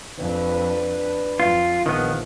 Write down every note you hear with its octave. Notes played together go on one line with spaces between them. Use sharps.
F2 D4 B4
F2 F4
A#1 E2 D#3 F3 B3